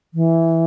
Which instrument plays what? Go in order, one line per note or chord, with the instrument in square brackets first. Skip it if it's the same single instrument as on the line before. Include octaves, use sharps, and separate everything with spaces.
[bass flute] E3